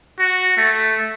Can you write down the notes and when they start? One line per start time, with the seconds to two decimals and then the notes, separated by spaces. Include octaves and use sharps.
0.19 F#4
0.57 A3